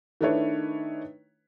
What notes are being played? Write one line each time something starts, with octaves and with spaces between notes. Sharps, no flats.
D#3 A3 D4 E4 B4 C#5